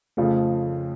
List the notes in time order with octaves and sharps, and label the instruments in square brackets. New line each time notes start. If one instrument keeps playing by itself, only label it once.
[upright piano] F2 C#3 F3 [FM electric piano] A3